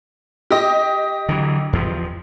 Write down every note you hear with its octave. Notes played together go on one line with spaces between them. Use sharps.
G4 D#5
D3 E3 F#3
E2 F3